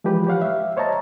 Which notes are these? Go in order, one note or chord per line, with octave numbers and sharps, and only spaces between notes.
E3 F3 G#3 G4 B4
G4 C#5 F5 F#5
E5 F5
C5 C#5 D#5 A5 A#5